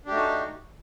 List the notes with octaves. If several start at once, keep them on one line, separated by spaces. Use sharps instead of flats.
A3 D4 D#4 F#4 G4